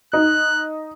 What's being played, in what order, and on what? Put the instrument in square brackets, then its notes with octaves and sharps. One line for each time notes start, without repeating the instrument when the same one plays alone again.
[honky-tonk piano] D#4 [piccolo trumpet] F#6